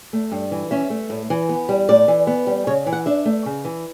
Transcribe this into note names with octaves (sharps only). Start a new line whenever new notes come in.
A3
G2
E3
C#4 E5
A3
A2
E3
B3
G3
A2 D5
E3
B3
G3
C#3 C#5
E3
F#5
D4 E5
A3
C#3
E3